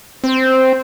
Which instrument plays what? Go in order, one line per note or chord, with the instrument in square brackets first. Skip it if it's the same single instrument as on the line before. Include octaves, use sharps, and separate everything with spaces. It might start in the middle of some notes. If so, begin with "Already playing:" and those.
[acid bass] C4 [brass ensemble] C5